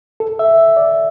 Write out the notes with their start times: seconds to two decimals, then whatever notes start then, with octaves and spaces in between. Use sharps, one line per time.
0.20 A4
0.39 E5
0.57 E5
0.77 D5